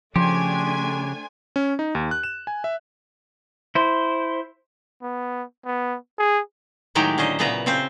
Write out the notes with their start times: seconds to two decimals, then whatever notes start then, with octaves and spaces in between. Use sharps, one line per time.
0.16 C#3 F3 A3 D4 G4 C5 G5 G#5
1.56 C#4
1.79 D#4
1.95 D#2
2.11 F#6
2.23 E7
2.47 G#5
2.64 E5
3.75 E4 C5
5.02 B3
5.65 B3
6.18 G#4
6.95 A2 D#3 F#3 G#3 G4 A#5
7.18 D3 C#4 C5 D#5
7.39 A#2 C#3 B3 B4 E5 A#5
7.66 C#3 C4 C5